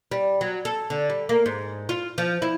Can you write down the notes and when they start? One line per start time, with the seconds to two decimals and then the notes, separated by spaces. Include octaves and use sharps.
0.12 G3
0.41 F#3
0.65 A4
0.90 D3
1.10 G3
1.29 A#3
1.46 G#2
1.89 F4
2.18 F3
2.42 E4